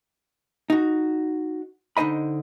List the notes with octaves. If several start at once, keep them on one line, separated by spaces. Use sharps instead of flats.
D#4 F#4
D3 D#4 C5 D#5 B5